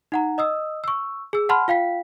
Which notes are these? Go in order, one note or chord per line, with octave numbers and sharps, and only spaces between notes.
D#4 F#5 A#5
D#5 D#6 E6
C#6 E6
G#4 E6
F#5 A5 B5 C6 F6
F4 F5 G5 B6